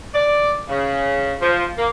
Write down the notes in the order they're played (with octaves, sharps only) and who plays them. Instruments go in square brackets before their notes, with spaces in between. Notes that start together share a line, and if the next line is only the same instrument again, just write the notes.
[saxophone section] D5
C#3
F3
A#3